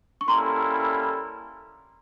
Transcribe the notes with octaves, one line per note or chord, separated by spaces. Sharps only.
C#6
G3 A#3 C#4 E4 A4 A#5 C6